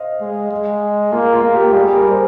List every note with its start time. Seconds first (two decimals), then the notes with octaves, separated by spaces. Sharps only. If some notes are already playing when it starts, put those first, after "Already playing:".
Already playing: C5 D#5 F5
0.21 G#3
0.51 G#3
1.12 A#3 F4
1.33 F4
1.43 A#3
1.54 G4
1.74 G3 G#4
1.96 A#4
2.11 C5